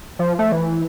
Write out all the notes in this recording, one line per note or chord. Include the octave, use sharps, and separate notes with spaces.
F3
A3
E3